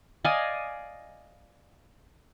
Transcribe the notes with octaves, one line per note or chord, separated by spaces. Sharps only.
D5 D#5 F5 G#5